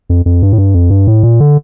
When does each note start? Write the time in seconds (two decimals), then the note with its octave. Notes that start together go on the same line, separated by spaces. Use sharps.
0.10 F2
0.26 F2
0.43 G2
0.53 A2
0.58 G2
0.75 F2
0.90 G2
1.07 A2
1.23 A#2
1.40 D3